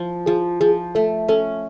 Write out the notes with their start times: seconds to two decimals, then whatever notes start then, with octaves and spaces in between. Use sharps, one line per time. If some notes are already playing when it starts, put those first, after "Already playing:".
Already playing: F3 F4
0.26 F3 G#4
0.61 F3 G#4
0.95 A3 A4
1.28 C#4 A4